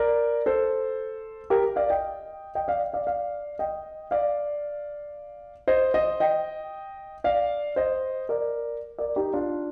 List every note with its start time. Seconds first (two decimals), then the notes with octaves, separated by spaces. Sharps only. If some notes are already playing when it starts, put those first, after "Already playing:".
Already playing: A#4 D5
0.46 A4 C5
1.50 G4 A#4
1.76 D5 F5
1.90 D#5 G5
2.55 D#5 G5
2.68 D5 F5
2.93 D5 F5
3.07 D5 F5
3.59 D#5 G5
4.11 D5 F5
5.68 C5 D#5
5.94 C5 D#5
6.20 D#5 G5
7.24 D5 F5
7.76 C5 D#5
8.29 A#4 D5
8.98 A#4 D5
9.16 D#4 G4
9.34 D4 F4